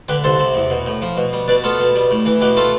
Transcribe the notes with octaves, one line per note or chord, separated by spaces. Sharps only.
D3 G4 B4
C2 A4 C5
C3
E2
B2
A2
F3
B2
G3
B2 B4 D5
B3 F4 A4
B2
G3
A2
E3
B2 G4 B4
A3 F4 A4